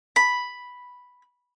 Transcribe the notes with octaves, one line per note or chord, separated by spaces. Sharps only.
B5